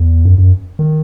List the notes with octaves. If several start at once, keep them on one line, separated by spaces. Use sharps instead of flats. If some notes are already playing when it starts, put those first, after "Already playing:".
Already playing: E2
F#2
F#2
D#3